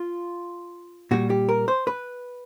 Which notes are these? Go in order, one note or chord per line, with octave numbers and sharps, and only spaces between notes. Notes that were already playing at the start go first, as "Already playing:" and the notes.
Already playing: F4
A#2 G3 F#4
G4
A#4
C5
B4